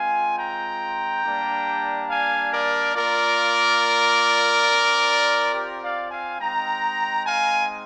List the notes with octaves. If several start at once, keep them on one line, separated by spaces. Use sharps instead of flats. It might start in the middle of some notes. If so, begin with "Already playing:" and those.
Already playing: G#3 C4 F4 F5 G#5
G5 A#5
G3 A#3 D4
F5 G#5
A#4 D5
A#3 F4 A#4 D5
C4 F4
G4 A#4
D5 F5
F5 G#5
G#3 C4 D#4 G5 A#5
F5 G#5